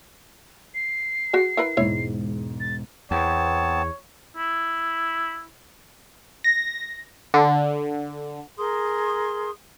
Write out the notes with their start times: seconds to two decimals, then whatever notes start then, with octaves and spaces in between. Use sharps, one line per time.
0.75 C7
1.33 F#4 G#4
1.57 E4 A#4 B4
1.77 E1 G#2 E4 C#5
2.60 A6
3.11 E2 B3 C4 C#5 A5
4.37 E4
6.44 A#6
7.34 D3
8.58 G#4 A#4 C6 D#6